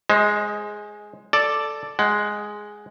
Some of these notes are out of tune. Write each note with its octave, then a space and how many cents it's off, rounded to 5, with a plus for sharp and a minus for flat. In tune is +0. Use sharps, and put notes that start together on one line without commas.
G#3 +0 C5 +35 D#5 +25
A4 +0 D5 +0
G#3 +0 F#5 +35